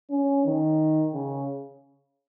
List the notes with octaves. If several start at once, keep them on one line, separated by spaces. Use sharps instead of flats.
C#4
D#3
C#3